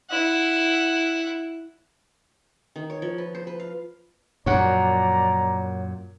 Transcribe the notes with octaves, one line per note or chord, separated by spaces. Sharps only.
E4 F#5
D#3
C#5
F3
B4
C5
B4
F5
F#2 A#2 F3 C#5 D5 F#5 A#5